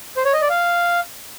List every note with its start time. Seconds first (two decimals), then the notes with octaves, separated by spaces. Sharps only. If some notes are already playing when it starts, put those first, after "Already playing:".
0.17 C5
0.25 C#5
0.33 D#5
0.41 D5
0.50 F5